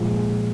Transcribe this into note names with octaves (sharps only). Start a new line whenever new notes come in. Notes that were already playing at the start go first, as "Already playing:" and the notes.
Already playing: A#2 F3 G#3